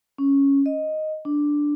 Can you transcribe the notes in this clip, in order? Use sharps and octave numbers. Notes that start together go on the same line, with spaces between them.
C#4
D#5
D4